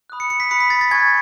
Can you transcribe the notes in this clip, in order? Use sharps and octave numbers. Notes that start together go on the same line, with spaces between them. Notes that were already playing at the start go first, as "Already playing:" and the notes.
B5 D#6 F#6
C#7
C#7
B6
B5 D#6 F#6 C#7
B6
A6
A6
G#5 C#6 F#6 G#6